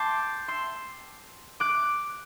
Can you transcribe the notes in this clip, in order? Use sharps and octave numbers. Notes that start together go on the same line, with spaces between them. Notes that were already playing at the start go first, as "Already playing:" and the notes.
Already playing: G5 A5 C6 D6
C6 E6
D6 F#6